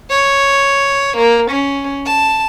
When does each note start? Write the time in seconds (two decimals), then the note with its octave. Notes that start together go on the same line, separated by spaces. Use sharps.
0.10 C#5
1.17 A#3
1.50 C#4
2.06 A5